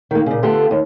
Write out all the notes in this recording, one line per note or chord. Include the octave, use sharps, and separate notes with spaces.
D#3 A#3
A#2 C#3
D3 A3 B3 F4 G4 A4
D#2